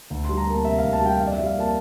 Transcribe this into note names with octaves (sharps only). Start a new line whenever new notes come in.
D2
C6
G3
A#5
A#3 A5
C3 E5
F5
D2
A5
G3 G5
F2 F5
D5
E5
G3
F5
A#3
A5